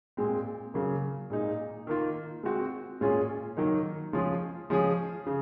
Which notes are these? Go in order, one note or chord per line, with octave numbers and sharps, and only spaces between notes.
A#2 G#3 C4
C#3 F#3 A#3
A#2 G#3 D#4
D#3 A#3 F4
G#3 C4 F#4
A#2 G#3 C#4 F4 G#4
D#3 F#3 A#3 D#4
F3 G#3 C#4 F4 G#4
F3 G#3 C#4 G#4
C#3